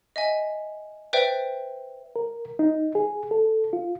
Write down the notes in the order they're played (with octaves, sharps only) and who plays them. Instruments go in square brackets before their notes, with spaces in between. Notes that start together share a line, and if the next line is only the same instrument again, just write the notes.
[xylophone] D#5 E5 G#5
B4 C5 D5 E5 G5
[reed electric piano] A#4
D#4
G#4
A4
F4